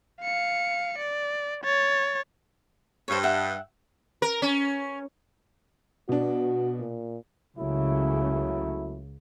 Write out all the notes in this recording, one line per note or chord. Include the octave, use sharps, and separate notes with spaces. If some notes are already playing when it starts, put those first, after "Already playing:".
F5 C#7
D5
C#5 A6
G2 C5 C#5
E5 F#5 G5
A#4
C#4
B2 D4 F#4
A#2
C#2 C#3 F#3 A3 E4